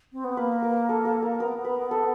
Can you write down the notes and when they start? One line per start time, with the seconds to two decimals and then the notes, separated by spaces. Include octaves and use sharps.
0.13 C4
0.24 B3
0.37 A#3 B4
0.62 A#4
0.89 A4
1.05 A4
1.22 A#4
1.39 B3 A#4
1.65 B4
1.91 A4